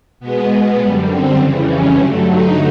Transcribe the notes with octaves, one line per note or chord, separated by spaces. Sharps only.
B2 G#3 B3
F#2 D3 G3 B3
C4
F2 C#3 E3 G3
C#4
G2 D3 F#3 A3 D4
D#4